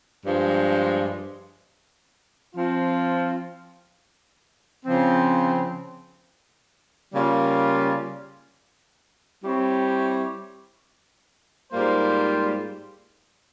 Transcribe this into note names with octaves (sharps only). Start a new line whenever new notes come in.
G2 F3 G#3
F3 C4 F4
C#3 F3 C4
C#3 G3 A#3 F4
G3 C4 E4 G4 C#5
G#2 G3 A#3 F4 C5